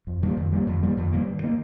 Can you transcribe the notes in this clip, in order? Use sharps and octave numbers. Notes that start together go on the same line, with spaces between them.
F2
D#3 G3 A#3
F2
D#3 G3 A#3
F2
D#3 G3 A#3
F2
D#3 G3 A#3
G2
D#3 A#3